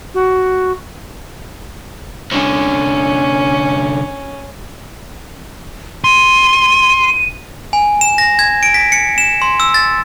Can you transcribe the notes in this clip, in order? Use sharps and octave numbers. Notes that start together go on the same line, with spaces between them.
F#4
C2 D3 C#4
C6 D#7
G#5
E7
A#6
G#6
D7
B6
C#7
E7
C6
E6
A6